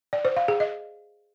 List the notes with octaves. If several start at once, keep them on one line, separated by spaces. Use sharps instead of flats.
D5
C5
F5
G#4
D#5